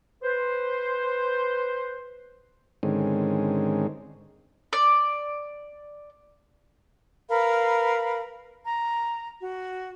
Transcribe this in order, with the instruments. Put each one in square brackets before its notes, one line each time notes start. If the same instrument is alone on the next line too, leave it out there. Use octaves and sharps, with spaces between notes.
[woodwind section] B4 C5
[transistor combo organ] G#2 D3 D#3 G#3 C4 C#4
[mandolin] D5
[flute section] A#4 B4 F5 B5
A#5
F#4